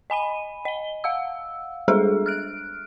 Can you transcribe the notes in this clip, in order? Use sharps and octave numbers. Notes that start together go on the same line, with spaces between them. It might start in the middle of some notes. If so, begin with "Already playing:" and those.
D#5 G#5 B5 D#7
D#5 G7
F5 F#5 E6
G3 G#3 D4 G#4 A4 E5
F6 F#6 D7